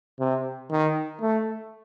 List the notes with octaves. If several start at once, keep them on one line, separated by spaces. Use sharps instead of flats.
C3
D#3
A3